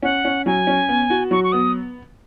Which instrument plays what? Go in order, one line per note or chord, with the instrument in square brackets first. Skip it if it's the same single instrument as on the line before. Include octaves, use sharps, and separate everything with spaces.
[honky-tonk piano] C#4 [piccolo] F#5
[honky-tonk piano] C#4
[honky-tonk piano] F#3 [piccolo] G#5
[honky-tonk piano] C#4
B3
F#4
[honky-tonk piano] F#3 [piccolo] C#6
[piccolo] C#6
[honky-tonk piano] B3 [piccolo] D#6